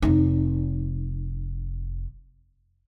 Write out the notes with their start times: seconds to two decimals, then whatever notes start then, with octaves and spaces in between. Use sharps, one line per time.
0.02 F1 D#4